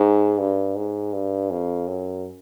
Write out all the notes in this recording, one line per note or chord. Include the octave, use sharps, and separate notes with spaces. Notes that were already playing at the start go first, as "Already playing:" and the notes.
Already playing: G#2
G2
G#2
G2
F2
F#2